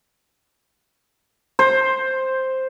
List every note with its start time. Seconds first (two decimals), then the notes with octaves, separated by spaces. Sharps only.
1.59 C5